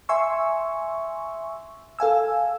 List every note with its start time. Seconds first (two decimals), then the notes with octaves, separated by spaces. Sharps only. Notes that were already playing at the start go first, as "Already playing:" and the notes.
0.09 E5 G#5 C6 C#6 E6
1.99 A4 F5 G#5 E6